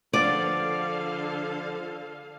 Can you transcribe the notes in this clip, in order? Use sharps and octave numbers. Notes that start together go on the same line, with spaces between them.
D3 F3 B3 D4 A4 D5 F5